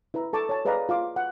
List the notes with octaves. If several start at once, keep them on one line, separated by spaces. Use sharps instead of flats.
E4 B4 E5 A#5
A4 A5 C#6 D6
C#5 A5
G#4 B4 D5 D#5 F5 A#5
F4 F5 D6
F#5